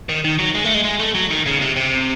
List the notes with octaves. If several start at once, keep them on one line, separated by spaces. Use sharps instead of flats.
D#3
D#3
F#3
G#3
A3
G#3
G#3
A3
F#3
D#3
C#3
C3
C3